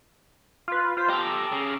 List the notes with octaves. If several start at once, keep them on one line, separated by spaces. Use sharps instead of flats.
F4 B4
F4 C5 B6
G4 A4 A#5 D6 E6
C#3